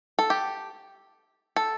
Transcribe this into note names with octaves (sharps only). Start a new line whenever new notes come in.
A4
G4
A4